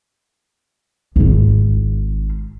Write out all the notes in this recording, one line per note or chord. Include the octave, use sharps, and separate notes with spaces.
G#1 F4